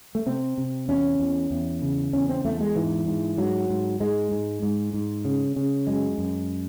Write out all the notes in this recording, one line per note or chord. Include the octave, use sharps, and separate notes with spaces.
A3
C3 C4
C3
E2 C#4
E2
E2
C#3
E2 C#4
C4
E2 A3
G#3
G#2 E3
G#2
G#2 F#3
G#2
G#2 G#3
G#2
G#2
G#2
C#3
C#3
F#2 G#3
F#2